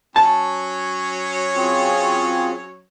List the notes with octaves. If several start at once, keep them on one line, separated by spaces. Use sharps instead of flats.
F#3 C#4 C#5 A5
C4 F4 G#4